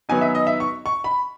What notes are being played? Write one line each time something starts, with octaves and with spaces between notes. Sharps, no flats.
D#3 F#3 B3 D#4 G#5
E5
D#5
E5
C#6
C#6
B5